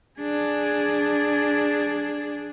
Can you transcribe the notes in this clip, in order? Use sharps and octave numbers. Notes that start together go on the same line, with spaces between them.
D4 G#4